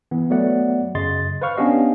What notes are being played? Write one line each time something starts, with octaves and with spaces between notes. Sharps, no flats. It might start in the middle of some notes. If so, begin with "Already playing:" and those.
E3 B3
F#3 A3 B3 D5 F#5
F#2 C#3 D#5 C6 A6
B4 C5 F5 C#6 F6
B3 C#4 D4 G4 D#5 F5